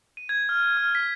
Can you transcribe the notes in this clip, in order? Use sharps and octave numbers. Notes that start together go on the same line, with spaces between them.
D#7
G#6
F6
F6
B6